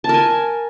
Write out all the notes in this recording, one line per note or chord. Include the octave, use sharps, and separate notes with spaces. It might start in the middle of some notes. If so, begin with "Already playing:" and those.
A#4 G#5 A5